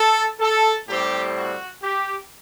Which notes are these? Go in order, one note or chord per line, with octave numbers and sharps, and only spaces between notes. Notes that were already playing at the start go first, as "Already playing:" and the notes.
Already playing: A4
A4
A2 G3 C4 G4
F#4
G4